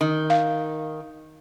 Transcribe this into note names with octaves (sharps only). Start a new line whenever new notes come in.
D#3
F5